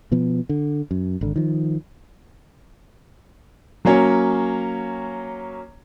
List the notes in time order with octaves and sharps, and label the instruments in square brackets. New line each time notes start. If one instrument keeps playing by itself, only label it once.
[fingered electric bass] B2 F3 B3
D3
F#2
G#1 D3
D#3 F3
[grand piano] F#3 A#3 C#4 C#5